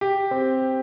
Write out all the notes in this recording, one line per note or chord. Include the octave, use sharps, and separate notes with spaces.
G4
C4